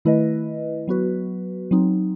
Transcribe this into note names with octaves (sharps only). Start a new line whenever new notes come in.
D#3 A3 E4 B4 D#5
F#3 B3 F#4 B4
F#3 C4 D#4